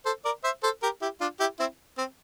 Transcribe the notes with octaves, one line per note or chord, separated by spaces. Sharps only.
A4 C5
A#4 D5
C5 E5
A4 C5
G4 A#4
E4 G4
D4 F4
E4 G4
C4 E4
C4